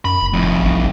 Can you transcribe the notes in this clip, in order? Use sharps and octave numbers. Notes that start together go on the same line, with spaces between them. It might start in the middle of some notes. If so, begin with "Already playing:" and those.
F#2 B5
F1
F1 F2 A2
A1
A#1